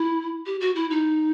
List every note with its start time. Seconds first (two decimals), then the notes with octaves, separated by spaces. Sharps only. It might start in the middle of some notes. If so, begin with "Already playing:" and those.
Already playing: E4
0.46 G4
0.61 F#4
0.76 E4
0.90 D#4